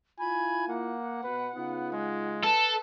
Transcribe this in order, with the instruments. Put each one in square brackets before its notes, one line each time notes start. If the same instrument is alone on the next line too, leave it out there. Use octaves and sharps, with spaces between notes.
[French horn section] E4 F4 [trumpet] G#5 [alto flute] B5
[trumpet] A#3 [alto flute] F#5
[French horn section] B2 [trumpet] B4
[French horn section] C#3 D#4 F4 [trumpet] B3
[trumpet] G#3
[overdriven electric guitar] A4 [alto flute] B4